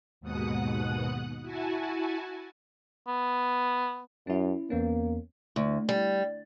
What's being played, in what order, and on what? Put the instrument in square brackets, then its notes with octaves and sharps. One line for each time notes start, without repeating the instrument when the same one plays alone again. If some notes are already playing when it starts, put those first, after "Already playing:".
[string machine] D#2 G#2 B2 F#5 D#6 F#6
E4 F#4 G#5 A5
[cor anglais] B3
[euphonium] F#2 [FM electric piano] C#4 E4
[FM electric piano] E2 B3 C#4 [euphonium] A#3
[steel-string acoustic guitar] D2
G3